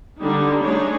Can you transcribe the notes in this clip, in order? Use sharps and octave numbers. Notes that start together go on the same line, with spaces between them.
D3 G3 D#4
A3 D4 D#4 G#4 C#5